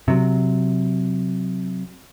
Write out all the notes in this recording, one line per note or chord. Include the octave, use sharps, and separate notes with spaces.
C3 F#3